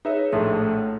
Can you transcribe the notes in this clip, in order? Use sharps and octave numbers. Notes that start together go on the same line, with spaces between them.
D#4 G#4 B4 C#5 E5
A#1 A2 A3 C6